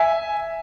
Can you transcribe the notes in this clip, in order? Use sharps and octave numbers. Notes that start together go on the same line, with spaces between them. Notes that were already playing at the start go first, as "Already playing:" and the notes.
Already playing: E5 G#5